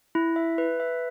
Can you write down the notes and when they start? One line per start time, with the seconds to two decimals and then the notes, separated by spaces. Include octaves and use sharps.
0.15 E4
0.36 E5
0.58 B4
0.80 E5